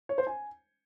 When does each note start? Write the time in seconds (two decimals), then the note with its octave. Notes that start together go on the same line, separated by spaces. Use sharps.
0.09 C#5
0.18 C5
0.27 G#5